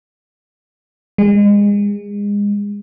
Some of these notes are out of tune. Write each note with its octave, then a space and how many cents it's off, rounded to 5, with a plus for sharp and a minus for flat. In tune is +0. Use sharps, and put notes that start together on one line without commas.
G#3 -30